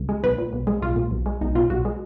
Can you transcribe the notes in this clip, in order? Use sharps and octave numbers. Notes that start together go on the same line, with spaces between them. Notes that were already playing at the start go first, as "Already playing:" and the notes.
Already playing: C#2
G#3
B1 B4
A#2
B1
G#3
B1 F4
A#2
B1
G#3
B1 D#4
B2 F4
B1 F#4
G#3